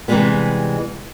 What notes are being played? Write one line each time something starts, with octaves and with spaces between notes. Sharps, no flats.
C3 E3 F3 G3 G#3 B3